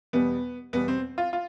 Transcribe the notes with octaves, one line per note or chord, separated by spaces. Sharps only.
E2 B2 G3 B3
E2 B2 G3 B3
C4
F4
F4